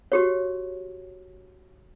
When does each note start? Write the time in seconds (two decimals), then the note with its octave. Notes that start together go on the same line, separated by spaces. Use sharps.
0.12 F#4 G4 C#5